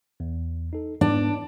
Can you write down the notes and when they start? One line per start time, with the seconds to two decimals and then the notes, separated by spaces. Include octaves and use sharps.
0.20 E2
0.73 D#4 A4
1.01 G#2 B3 D4